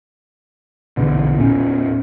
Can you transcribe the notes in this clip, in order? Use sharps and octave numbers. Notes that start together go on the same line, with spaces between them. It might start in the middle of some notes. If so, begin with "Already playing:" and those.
A#1 E2 B2 D3
E2 A#2 C#4